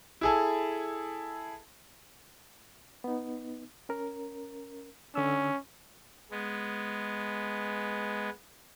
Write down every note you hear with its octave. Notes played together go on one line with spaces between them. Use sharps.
E4 G#4 A4
B3 D#4
C#4 A#4
D3 C#4 E6
G#3 B3